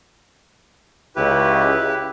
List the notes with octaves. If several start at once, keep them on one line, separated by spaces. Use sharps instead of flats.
C#2 E4 G4 B4